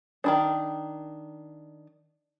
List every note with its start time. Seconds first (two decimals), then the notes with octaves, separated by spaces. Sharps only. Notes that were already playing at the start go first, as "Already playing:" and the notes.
0.24 D#3 E3 D4